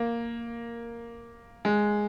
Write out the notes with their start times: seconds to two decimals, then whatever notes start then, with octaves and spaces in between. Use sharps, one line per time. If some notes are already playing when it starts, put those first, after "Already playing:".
Already playing: A#3
1.65 G#3